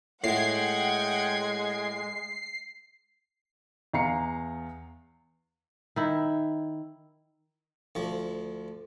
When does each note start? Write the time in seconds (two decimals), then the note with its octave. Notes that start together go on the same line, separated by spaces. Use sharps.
0.24 A2 G#3 F#5 G5 G#6 C7
3.94 E2 F5 A#5 C7 C#7
5.96 D#3 E4
7.95 D2 F3